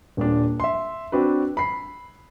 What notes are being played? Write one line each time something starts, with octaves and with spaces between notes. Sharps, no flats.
D#1 A#2 D4
E5 C6
C4 D4 F#4 B4
B5 C7